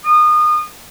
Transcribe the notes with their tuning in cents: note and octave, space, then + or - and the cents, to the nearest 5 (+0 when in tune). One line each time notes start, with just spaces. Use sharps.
D#6 -30